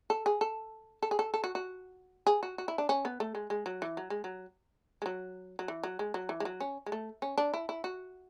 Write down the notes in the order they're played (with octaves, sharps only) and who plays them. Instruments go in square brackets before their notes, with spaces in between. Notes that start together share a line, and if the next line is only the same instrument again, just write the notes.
[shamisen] A4
G#4
A4
A4
G#4
A4
A4
F#4
F#4
G#4
F#4
F#4
E4
D4
C#4
B3
A3
G#3
G#3
F#3
E3
F#3
G#3
F#3
G#3
F#3
F#3
E3
F#3
G#3
F#3
E3
G#3
F#3
C#4
G#3
A3
C#4
D4
E4
E4
F#4